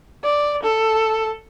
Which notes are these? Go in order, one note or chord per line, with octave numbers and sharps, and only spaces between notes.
D5
A4